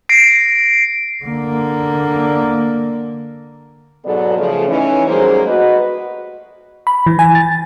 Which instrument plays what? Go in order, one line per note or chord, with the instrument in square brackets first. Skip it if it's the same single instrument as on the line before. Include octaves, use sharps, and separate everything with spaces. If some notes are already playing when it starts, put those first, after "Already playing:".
[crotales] A#6 C7 D7
[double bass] D3 A#3
[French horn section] G#2 B2 F#3 B3 A4 D5
C#3 F3 A3
E3 C#4 D#4
F#3 G3 A3 A#3 G#4 C5
F#4 B4 D#5
[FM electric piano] B5
E3
G#5
A6